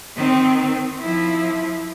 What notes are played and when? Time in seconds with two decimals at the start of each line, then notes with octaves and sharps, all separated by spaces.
0.16 D#3 C4
0.99 F3 E4